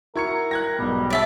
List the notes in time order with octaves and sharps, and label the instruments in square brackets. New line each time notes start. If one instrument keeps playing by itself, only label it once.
[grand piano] E4 C#6 C#7 [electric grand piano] F#4 G#6 [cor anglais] A#4
[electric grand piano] G5 [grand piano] F#6 G#6 A#6
[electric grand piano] B1 G#2 B2 [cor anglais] G3
[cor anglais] C#5 [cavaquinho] D5 E5 A5